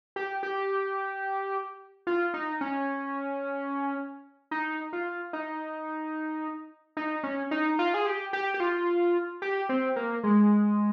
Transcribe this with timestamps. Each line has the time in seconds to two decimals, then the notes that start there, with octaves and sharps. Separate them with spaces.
0.16 G4
0.43 G4
2.07 F4
2.34 D#4
2.61 C#4
4.51 D#4
4.93 F4
5.33 D#4
6.97 D#4
7.23 C#4
7.51 D#4
7.79 F4
7.94 G#4
8.06 G4
8.33 G4
8.54 G4
8.60 F4
9.42 G4
9.69 C4
9.96 A#3
10.24 G#3